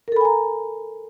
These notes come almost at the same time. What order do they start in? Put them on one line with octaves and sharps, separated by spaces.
A#4 A4 B5 G#5 A#5